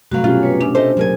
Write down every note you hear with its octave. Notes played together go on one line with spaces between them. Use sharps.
G2 C3 F#3 A3 F#4 F5
B2 C#4 F4 G4
B4 C#5
F#2 D4 F4
A3 A4 C5 D#5
D#2 F#3 G#4 A#4 G#5